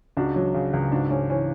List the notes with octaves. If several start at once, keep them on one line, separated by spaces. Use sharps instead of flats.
C#2 D4 F#4
F#3
C#3
C#2
G#2 D4 F#4
G#2 C#4
E3 C#4